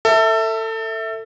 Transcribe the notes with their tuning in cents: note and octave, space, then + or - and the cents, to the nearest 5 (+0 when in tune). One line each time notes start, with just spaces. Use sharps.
A4 +25 E5 -10